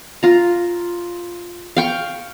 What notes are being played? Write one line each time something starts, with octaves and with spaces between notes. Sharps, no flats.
F4 A#5
F5 G5 C#6